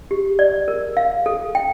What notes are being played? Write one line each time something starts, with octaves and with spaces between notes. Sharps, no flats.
G4
D5
A#4
F5
A4
G5